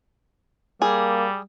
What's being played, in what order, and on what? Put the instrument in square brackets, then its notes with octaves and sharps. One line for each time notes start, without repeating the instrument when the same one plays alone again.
[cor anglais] G3 [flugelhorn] A#3 [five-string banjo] G#4